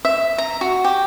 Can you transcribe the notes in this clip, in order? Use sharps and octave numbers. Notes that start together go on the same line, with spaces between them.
E5
A#5
F#4
G4